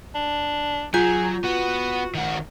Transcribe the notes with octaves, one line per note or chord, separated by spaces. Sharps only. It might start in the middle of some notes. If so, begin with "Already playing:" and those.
D4
F#3 F4 G#4 G6
B3 F#4
D#3 F#4